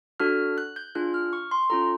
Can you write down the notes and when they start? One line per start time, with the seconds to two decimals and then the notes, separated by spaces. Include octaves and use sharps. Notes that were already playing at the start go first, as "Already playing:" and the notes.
0.20 D4 F#4 A4 F6
0.58 F#6
0.76 G6
0.95 D4 F4 G#4 F#6
1.14 F6
1.33 C#6
1.51 C6
1.70 C#4 F4 A4 A#5